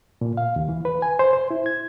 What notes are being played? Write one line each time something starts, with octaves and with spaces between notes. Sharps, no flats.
A#2
F5
D#2
E3
B4
G#5
C5
C5
E4
G#6